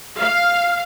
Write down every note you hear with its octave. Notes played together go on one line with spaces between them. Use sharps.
F5